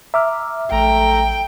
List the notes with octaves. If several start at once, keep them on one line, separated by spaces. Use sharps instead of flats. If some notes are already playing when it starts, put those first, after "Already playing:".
E5 A#5 D6 F6
A1 A3 G5 A#5